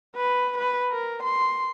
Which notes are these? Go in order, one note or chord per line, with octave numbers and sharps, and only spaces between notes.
B4
B4
A#4
C6